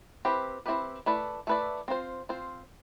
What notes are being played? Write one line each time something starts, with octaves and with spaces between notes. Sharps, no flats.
C4 E4 G4 B4
C4 E4 G4 B4
A3 E4 B4 D5
A3 E4 B4 D5
C4 F4 C5
C4 F4 C5